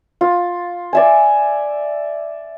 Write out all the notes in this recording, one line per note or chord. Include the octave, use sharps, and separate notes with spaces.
F4
D5 E5 G#5